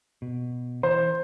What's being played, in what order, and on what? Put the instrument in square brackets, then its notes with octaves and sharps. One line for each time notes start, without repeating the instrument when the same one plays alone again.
[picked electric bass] B2
[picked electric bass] E3 [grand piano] C5